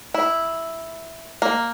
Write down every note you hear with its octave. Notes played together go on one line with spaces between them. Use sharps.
E4
A#3